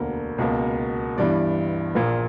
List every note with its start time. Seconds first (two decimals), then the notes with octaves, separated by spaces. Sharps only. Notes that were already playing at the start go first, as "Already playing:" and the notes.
Already playing: E1 D2 D3 A#3
0.38 C#2 B2 A#3
1.16 G1 G2 E3 D5
1.95 A#1 A#2 A#3